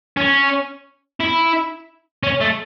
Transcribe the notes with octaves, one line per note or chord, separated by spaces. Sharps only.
C#4
E4
C#4
A3